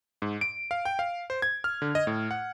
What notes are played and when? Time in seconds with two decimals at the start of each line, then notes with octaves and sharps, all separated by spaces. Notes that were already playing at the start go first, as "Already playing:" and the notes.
0.22 G#2
0.41 D7
0.71 F5
0.85 G5
0.99 F5
1.30 C5
1.42 G#6
1.64 F6
1.82 D3
1.95 D#5
2.07 A2
2.31 F#5